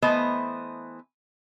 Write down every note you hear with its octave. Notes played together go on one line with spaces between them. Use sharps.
E3 A3 B3 C5 D#5